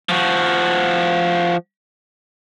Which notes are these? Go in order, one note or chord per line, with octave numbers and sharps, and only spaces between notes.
F3 F#4